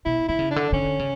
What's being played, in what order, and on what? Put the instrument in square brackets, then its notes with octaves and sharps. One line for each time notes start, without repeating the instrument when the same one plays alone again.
[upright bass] B2 [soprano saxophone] E4
[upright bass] D3 [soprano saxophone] E4
[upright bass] C#3
[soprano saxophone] D4
[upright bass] D3
[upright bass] D3 [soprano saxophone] C#4
[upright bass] C#3